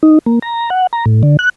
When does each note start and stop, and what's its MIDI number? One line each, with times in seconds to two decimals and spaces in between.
0.03 0.19 63
0.26 0.39 58
0.42 0.70 82
0.70 0.87 78
0.93 1.05 82
1.06 1.22 45
1.23 1.37 50
1.39 1.49 90